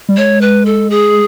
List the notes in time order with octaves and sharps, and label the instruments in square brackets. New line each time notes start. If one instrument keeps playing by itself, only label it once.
[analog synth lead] G3
[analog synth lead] G#3 [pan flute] C#5
[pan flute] B4
A4
G#4